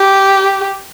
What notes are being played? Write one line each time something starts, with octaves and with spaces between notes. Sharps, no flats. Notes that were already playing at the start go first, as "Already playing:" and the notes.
Already playing: G4